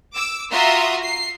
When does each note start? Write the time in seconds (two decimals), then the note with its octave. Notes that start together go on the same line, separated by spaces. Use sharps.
0.14 D6 E6
0.51 F4 F#4 E5 A#5 C6 D#6
1.02 C7